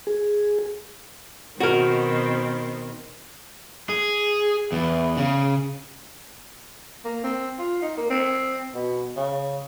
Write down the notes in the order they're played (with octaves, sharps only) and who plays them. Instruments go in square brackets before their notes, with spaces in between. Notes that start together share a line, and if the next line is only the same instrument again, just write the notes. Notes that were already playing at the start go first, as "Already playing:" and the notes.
[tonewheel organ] G#4
[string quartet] B2 D#3 C4 [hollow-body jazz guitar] F#4 A#4
[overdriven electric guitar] G#4
E2
C#3
[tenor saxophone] A#3
C4
F4
D#4
A#3
C4
B2
C#3